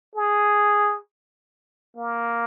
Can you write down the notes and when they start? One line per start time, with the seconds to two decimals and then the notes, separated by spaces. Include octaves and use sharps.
0.15 G#4
1.96 A#3